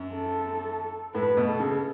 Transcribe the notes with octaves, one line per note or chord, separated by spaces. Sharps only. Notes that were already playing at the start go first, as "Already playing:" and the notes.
Already playing: F#2
A4
A2 B4
B2
A4
C#3